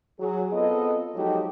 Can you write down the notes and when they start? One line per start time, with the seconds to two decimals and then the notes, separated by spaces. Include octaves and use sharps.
0.20 F#3 G#4
0.52 B3 C4 F4 A4 D#5
1.15 F3 F#3 G#3 D#4 G4 A4